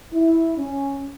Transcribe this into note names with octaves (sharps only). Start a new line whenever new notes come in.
E4
C#4